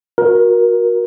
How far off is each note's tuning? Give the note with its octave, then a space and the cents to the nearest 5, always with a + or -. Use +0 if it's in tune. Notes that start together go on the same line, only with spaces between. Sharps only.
F#4 -20 A#4 +20